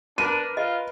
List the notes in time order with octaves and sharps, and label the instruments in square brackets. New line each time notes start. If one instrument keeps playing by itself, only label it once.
[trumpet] D4 [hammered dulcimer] A#4 B4 [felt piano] D#7
[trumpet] F4 [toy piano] D#5